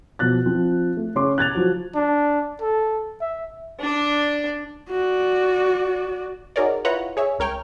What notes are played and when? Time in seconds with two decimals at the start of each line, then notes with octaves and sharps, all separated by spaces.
0.19 B2 F3 F#6 A6
0.46 F3 C4
0.97 A3
1.15 C#3 C#4 C6 D6
1.38 F#6 G#6 A6 F7
1.55 F3 F#3
1.95 D4
2.61 A4
3.21 E5
3.81 D4
4.89 F#4 D5
6.56 D#4 F#4 G#4 A#4 C#5 D5
6.85 E4 F4 B4 C#5 F#5 A#5
7.17 G#4 C#5 E5
7.39 C#2 A#4 C#5 G5 F6